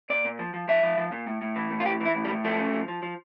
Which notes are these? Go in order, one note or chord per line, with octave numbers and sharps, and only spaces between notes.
A#2 D5
A#2
F3
F3
F3 E5
F3
F3
A#2
A2
A2
E3
A2
F4
E3 G4
E3 E4
A2
G3
A2
F3 A3
C#3
F3
F3
F3